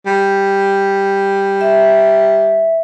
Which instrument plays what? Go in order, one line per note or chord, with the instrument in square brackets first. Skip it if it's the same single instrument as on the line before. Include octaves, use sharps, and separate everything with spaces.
[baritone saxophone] G3
[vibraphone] E5